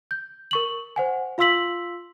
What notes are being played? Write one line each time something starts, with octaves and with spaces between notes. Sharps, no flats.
G6
A#4 C#6 F#7
C5 F#5 G#5
F4 F5 C6 E6 B6 F#7